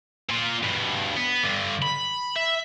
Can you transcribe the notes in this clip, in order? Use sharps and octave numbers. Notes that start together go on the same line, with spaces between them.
A#2 F4
G2 B2
B3
G2 D3
B5
E5